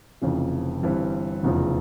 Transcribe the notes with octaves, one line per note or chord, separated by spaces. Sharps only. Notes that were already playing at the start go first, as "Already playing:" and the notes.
F1 F2 C#3 E3
G1 G2 E3 G3 C4
F1 E2 C#3 F3